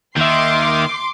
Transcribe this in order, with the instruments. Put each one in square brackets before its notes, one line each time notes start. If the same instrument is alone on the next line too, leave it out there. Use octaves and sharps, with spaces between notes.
[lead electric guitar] D#2 E5 [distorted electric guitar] D#3 [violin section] C6 D6